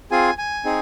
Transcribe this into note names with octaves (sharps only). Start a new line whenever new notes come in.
C4 F4 G#4 G#5
G#5
C4 D#4 G#4